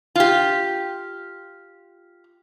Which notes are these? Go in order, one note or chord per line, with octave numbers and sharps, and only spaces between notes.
F4 G4